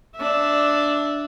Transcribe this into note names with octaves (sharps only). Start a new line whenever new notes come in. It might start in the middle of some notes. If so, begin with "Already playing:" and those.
D4 E5